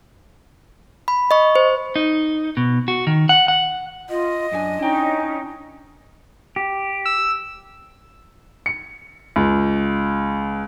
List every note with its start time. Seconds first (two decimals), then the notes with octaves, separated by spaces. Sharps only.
1.08 B5
1.31 D#5 C#6
1.55 C5
1.96 D#4
2.57 B2
2.88 F#4
3.07 D#3
3.29 F#5
3.48 F#5
4.09 F4 D#5
4.52 F#2 D4 G4 G#5
4.79 C#4 D#4 E4 G5
6.56 G4
7.06 E6
8.66 C#7
9.36 C#2